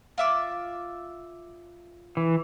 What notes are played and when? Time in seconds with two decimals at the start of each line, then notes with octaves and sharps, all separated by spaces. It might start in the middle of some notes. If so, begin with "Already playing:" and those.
0.18 F4 E5 D6
2.17 E3